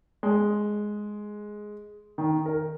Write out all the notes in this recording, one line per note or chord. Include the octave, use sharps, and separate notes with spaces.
G#3
D#3
A#4